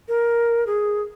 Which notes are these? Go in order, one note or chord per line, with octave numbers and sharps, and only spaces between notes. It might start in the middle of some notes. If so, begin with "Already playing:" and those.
A#4
G#4